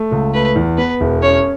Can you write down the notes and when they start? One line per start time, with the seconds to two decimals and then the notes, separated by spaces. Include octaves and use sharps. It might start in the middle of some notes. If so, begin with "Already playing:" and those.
Already playing: A3
0.11 C#2
0.34 A3 B4
0.56 E2
0.78 B3 B4
1.01 E1
1.22 C#4 C#5